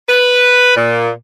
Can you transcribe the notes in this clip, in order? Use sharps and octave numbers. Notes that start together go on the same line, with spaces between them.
B4
A#2